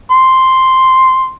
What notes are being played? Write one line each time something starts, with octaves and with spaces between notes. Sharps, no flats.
C6